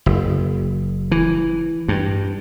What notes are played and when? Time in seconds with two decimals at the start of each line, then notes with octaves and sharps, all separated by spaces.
0.06 F#1
1.12 E3
1.88 G2